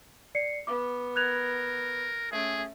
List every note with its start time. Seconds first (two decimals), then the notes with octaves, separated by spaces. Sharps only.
0.35 D5 C7 C#7
0.67 B3 D6
1.16 A#4 F#6 G#6 F7
2.32 A3 C#4 G#4